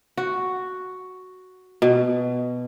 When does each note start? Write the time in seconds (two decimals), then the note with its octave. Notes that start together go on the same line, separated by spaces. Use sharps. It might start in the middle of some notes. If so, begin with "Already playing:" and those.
0.17 F#4
1.82 B2